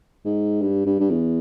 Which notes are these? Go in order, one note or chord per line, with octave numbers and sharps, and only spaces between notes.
G#2
G2
G2
G2
E2